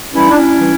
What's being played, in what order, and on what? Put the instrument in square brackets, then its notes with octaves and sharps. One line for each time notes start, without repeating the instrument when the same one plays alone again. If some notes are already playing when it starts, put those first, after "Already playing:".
[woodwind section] G2 E3 G3 C#4 E4
D4
C#4 E4
E3 G3